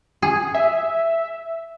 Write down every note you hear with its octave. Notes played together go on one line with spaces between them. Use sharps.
G#4
E5